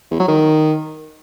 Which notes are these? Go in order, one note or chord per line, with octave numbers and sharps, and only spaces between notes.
E2
F#3
D#3